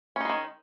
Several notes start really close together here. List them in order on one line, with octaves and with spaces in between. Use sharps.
C#4 D#4 G#3 D#3